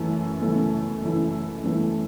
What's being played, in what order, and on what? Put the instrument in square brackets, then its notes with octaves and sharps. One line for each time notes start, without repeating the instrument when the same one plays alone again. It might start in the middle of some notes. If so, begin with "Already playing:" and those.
Already playing: [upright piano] F#2 E3 A3 E4
F#2 E3 A3 E4
F#2 E3 A3 E4
F#2 E3 A3 E4